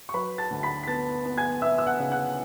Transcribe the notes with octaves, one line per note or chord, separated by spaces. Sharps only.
C#6
F#3 B4 B5
A5 A6
D2
B5 B6
B6
B3 A5 A6
B3
G#5 G#6
B3 E5 E6
E6
F#5 F#6
C#3
F#5 F#6